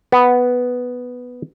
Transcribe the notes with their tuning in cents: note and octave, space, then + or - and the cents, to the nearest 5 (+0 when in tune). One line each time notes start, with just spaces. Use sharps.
B3 +0